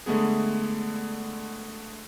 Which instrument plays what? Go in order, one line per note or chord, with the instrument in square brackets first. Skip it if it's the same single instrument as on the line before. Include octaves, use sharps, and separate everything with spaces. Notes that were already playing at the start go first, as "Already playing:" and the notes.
[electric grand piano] D3 G#3 A3 B3 G#4